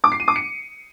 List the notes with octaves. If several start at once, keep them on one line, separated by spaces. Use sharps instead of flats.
D6
C7
D#7
D6
C#7